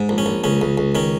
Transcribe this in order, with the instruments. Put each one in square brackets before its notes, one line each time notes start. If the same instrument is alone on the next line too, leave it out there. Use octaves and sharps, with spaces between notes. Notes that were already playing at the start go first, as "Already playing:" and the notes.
Already playing: [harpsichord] G#2
A#1
C#4
A#1
C#2 C#4
C#2
C#2
D#3 C#4